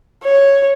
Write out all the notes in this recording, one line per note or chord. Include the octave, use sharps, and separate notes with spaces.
C#5